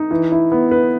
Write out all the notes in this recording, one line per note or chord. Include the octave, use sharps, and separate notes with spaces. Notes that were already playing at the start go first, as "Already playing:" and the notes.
Already playing: D#4
E3
E4
B3
B4